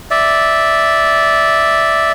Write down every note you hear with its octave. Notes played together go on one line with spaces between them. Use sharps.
D5 E5